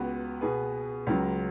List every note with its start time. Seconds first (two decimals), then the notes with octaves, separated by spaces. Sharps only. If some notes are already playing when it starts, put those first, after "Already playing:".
Already playing: C#2 C#3 B3 F#4 B4
0.41 B2 B3 G#4 B4
1.07 C#2 C#3 F#3